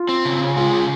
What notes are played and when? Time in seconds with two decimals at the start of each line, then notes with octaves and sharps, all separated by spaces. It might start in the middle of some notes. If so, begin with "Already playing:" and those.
Already playing: F4
0.09 C4
0.25 C#3
0.41 C#3
0.56 G#3 F4
0.72 C#3